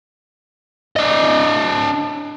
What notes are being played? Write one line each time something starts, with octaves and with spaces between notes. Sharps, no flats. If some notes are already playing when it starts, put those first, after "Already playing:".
D4 D#5